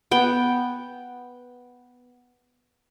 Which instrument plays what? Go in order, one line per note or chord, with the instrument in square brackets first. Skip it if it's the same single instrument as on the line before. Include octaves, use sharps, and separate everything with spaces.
[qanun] B3 G5